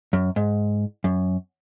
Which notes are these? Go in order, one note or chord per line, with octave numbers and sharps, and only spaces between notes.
F#2
G#2
F#2